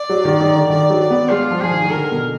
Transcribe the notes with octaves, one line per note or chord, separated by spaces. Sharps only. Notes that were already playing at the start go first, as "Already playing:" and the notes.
Already playing: D5
F#3
D#3
D#3
D3
D#3 D5
F#3
D5
B3
G#3 F4
F3
F3 G#4
D#3
D#3
D3 A#4
B2